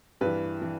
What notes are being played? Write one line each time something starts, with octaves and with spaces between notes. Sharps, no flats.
G2 E3 B4
E3